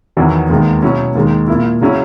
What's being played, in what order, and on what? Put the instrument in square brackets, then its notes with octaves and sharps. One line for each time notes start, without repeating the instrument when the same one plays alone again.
[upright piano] E2 D#3 F#3 B3 E4
D#2 D#3 G#3 B3
B2 F#3 C#4 E4
D#2 D#3 G#3
A#2 A#3 E4
C#3 F#3 C#4 E4